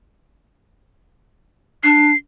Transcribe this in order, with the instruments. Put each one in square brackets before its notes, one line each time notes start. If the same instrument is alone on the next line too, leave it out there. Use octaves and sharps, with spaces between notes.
[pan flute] D4 [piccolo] C7